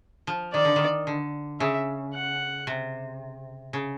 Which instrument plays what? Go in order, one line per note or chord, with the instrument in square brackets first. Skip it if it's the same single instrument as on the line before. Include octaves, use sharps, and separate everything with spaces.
[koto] F3
[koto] D#3 [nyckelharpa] D5
[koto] D3
D#3
D3
[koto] C#3 [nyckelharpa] E5
[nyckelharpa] F#5
[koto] C3
C#3